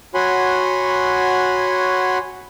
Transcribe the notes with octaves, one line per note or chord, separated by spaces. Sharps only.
F#4 C#5 F#5 G#5 B5 C6